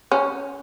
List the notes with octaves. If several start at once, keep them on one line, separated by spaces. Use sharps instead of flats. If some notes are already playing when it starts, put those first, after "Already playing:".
C#4